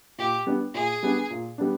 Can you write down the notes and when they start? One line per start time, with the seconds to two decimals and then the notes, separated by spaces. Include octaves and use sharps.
0.18 A#2 G4
0.47 G3 B3 D4
0.74 A#2 G#4
1.03 G3 B3 D4
1.30 A#2
1.58 G3 B3 D4